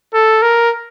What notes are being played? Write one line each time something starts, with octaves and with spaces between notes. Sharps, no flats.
A4
A#4